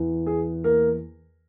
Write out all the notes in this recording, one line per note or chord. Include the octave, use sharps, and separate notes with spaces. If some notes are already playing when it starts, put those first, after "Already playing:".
Already playing: E2 E3
G#4
A#3 A#4